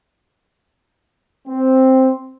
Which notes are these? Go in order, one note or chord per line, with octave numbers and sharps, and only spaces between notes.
C4